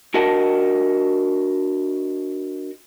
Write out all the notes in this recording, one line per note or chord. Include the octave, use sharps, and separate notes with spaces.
D4 F#4 A#4 D#5 F#5 A5